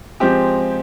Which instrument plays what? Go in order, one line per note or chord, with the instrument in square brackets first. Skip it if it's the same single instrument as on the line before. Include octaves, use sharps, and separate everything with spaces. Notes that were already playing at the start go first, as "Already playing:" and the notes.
[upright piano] F3 G#3 C4 G4